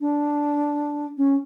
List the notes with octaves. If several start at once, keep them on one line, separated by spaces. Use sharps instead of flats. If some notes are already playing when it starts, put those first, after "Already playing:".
D4
C#4